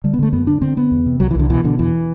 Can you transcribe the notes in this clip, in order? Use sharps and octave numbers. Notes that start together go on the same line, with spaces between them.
D3 G3
B3
D3 A3
F#2 B3
D3 D4
D3 C4
D3 B3
E2
C3
C2 F#3
E3
C2 D3
B2 E3
B2 D3
E2 E3